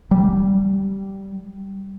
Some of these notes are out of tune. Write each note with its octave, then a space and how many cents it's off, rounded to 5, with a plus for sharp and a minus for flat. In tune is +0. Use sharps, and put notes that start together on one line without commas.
G3 -10